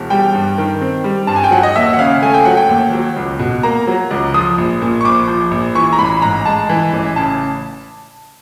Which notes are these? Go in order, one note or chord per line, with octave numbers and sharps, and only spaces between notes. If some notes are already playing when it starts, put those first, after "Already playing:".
Already playing: E1
G3 G5
G2
D#3
C4
G3
G2 A5
G#5
G5
F#3 F#5
D#5
D#2 E5
F#5
C#3 F5
A3 G#5
G5
F#3 F#5
G5
D#2
F#3
C#2
B2
A#3 A#5
F#3
C#2
F3 D#6
A#1
A#2
C#6
A#1 D6
F3
A#1
E3 C#6
A#5
A1 B5
G#2 A#5
G#3 A5
E3
A1
C#3 A5